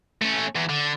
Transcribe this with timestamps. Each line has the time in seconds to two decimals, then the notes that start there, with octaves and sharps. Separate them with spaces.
0.22 A3 C#4
0.56 E2
0.70 D3